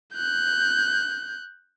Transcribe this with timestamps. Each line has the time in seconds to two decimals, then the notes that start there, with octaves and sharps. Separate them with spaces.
0.14 F#6 G6